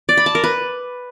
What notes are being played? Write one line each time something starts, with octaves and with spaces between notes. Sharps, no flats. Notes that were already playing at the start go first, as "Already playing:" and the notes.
D5
B5
A5
A#4
B4